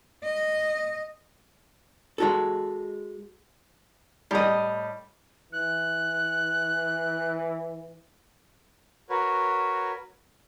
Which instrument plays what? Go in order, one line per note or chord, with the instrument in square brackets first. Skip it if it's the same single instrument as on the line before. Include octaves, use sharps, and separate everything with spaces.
[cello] D#5
[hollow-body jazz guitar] G#3 F#4 A4
[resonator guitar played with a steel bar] A2 D#5 [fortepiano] G3
[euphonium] E3 [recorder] F#6
[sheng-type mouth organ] F#4 A#4 B4 C#5